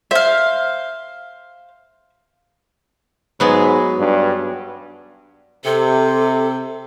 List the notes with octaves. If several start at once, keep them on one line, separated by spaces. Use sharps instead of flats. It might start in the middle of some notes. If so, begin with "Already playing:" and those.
C5 E5 F5
G#2 F#3 B3 G#4
G2
C3 A4